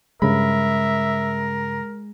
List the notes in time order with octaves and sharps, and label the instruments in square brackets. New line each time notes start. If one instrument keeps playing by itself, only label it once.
[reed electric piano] G2 C#3 B5 [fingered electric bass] G#3 [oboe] A#4 [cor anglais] E5